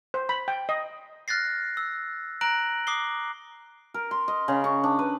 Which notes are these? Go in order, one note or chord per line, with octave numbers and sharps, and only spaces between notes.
C5
B5
G5
D#5
F6 F#6 A6 A#6 C7
E6
A#5 F#6 A#6 D7 F#7
D6 D#6 C7 G7
A#4
C6
D#5
C#3
C#6
D4
B4